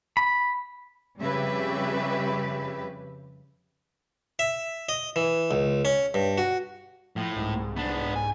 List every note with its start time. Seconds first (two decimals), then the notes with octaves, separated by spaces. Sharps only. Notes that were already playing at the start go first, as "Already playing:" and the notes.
0.17 B5
1.19 F2 C#3 G3 G4 B4 E5
4.39 E5
4.89 D#5
5.16 E3
5.51 C#2
5.85 C#4
6.14 G2
6.38 F#4
7.16 A2 F3
7.36 C2 G#2
7.76 B3 D4
8.16 G#5